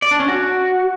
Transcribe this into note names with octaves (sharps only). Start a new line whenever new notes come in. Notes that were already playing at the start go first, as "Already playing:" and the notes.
D5
D4
C#4
F#4